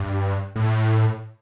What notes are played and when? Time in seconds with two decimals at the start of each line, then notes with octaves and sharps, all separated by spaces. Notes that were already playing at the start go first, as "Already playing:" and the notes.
Already playing: G2
0.56 A2